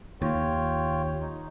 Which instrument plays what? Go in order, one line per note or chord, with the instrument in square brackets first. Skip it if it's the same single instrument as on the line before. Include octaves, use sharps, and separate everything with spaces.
[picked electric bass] D#2 [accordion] F4 C#5 G5
[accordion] D#4